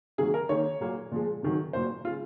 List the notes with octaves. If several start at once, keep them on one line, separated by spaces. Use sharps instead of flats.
C3 D#3 F#3 A#3 G#4
A#4
D#3 A#3 C#5
A#2 F#3 A#3
A#2 F3 G#3
C3 D#3 F#3
A#2 F#3 A#3 C5
C#3 G#3 F4